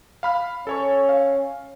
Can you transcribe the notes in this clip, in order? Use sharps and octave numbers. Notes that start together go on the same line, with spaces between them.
F5 B5 F6
C#4 A4 C#5 C#6
F5